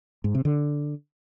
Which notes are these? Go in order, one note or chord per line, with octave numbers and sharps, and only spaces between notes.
G#2
C3
D3